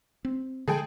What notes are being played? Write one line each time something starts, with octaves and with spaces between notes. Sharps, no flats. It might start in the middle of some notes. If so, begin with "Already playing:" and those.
C4
D3 F3 G#3 G#4 A4 G5